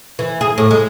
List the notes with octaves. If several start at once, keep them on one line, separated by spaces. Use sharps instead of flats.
E3
G#4
A2
G#3